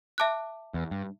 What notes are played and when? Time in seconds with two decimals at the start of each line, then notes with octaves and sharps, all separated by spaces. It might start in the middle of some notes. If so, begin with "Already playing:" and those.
0.18 E5 A5 D6 F#6
0.74 E2
0.91 G2